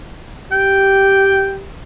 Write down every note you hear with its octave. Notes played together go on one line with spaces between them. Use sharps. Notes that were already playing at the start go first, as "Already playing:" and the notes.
G4 G5